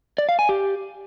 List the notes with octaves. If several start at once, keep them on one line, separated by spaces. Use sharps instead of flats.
D5
F5
G#5
G4